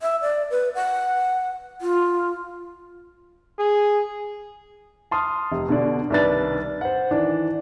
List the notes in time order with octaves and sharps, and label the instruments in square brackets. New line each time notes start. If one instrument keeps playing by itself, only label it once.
[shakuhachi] E5
D5
B4
F#5
F4
[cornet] G#4
[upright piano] A5 C6 D#6 F6
F1
B2 D3 D5
C2 D#3 D4 B4 A6
C5 F#5
D#3 E3 D4